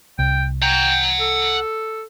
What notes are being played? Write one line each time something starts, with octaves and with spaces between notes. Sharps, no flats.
C2 G5
F#5 G5 A#5
A4